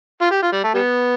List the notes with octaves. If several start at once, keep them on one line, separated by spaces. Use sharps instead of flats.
F4
G4
F4
G3
A3
G3 B3